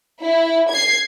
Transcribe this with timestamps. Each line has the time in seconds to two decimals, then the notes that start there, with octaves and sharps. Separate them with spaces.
0.24 E4
0.71 G#6 C7